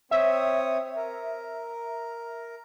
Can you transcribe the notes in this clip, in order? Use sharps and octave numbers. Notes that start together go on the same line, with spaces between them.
C4 C#5 E5 D#6
A#4